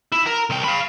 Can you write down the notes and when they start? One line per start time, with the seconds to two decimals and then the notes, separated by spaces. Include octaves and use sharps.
0.12 E4
0.26 A#4
0.50 C2 G5
0.64 F5 B5